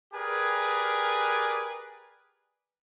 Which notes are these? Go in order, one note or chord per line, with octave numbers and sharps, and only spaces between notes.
G4 G#4 A#4 B4 D5 G#5